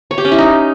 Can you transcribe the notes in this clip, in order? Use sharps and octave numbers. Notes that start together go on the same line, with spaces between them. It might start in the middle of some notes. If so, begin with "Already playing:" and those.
C#5
G4
C#4
E4
D#4